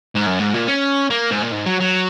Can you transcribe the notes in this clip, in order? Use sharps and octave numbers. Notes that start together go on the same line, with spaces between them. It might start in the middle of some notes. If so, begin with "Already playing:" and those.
G#2
F#2
G#2
A#2
C#4
A#3
G#2
A#2
G#2
F#3
F#3